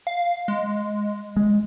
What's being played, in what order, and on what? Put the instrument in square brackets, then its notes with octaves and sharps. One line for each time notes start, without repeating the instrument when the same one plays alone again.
[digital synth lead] F5
G#3
[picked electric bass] G#3